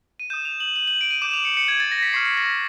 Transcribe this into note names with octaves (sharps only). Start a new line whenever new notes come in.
D#7
D#6 G6 E7
F7
F#7
F#7
F#7
D7
D#7
D6 G6 E7
F7
C#7
C#7
G#6
A6
A#6
B6
C#6 F6 C7
B6
A#6